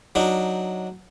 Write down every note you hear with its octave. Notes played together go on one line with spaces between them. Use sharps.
F#3 D4 D#4